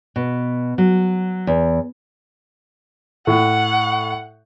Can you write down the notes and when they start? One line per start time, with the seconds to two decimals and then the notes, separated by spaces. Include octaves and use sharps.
0.16 B2
0.78 F#3
1.47 E2
3.27 A2 F#5